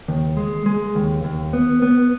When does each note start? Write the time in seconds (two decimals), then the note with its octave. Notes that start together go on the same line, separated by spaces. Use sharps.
0.08 D#2
0.37 G#3
0.66 G#3
0.95 D#2
1.24 D#2
1.53 B3
1.82 B3